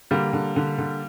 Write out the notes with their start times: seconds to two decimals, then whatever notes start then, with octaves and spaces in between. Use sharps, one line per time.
0.11 D3 G3 A#3
0.33 D3
0.56 D3
0.78 D3